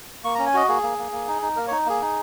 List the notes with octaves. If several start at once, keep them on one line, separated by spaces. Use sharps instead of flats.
A#3 C#6
C#4 A#5
G#5
F#4 D#5
A#3 G#4
A#3
A#3
A#3
D#4
D#4
A#3 A#4
D#4 C#5
A#3 G#4
D#4